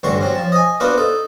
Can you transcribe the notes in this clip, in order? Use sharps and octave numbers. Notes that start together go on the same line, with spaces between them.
A1 G2 D3 F#3 C6 C#6
F#3 C4 C#4
F3 A5
D#5 G#5
B3 D4 F4 F#4 B4 C5
D#4 A4